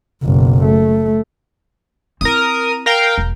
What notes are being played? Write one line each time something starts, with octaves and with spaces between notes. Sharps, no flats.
F#1 B1
A3
C4 E4 A#4 D#6
A#4 F5 G5
E1